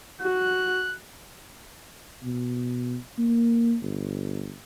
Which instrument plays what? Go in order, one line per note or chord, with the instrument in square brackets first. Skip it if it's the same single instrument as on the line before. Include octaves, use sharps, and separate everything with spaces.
[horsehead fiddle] F#4 [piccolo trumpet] F#6
[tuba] B2
A#3
G1